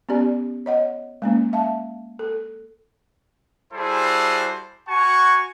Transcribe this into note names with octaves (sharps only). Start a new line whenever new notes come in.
B3 C#4 G4 D5
C#5 D#5 F#5
G#3 A#3 C#4
E5 F5 A5
A4
G3 E4 F#4 G#4 A4 C5
F#4 F#5 G#5 A#5 C#6